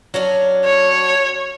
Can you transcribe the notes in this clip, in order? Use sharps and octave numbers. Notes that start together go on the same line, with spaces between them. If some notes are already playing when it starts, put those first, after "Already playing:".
F#3 C#4 D4
C#5